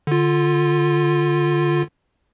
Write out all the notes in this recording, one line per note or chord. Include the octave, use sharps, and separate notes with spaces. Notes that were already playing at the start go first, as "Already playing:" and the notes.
D3 F4